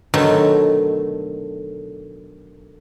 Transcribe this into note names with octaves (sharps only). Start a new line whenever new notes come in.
B2 D3 D#3 F#3 A3